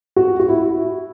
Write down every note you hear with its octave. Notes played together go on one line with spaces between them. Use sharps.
F#4
F#4
E4